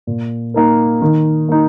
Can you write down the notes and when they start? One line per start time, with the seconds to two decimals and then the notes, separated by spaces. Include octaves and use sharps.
0.07 A#2
0.54 A#3 D#4 A#4
1.02 D#3
1.49 A#3 D#4